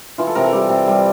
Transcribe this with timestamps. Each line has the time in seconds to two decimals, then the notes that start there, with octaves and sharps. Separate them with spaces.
0.18 E3 F4
0.27 A4
0.35 C3 A#4
0.44 A4
0.52 G3 G4
0.69 C3
0.87 G3